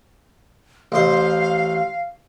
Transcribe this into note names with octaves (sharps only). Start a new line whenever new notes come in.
A1 C5 F5